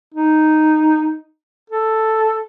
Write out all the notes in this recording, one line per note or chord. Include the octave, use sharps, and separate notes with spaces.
D#4
A4